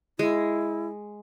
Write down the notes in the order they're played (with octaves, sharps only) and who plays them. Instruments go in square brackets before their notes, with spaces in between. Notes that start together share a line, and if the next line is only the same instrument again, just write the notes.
[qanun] G#3 [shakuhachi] E4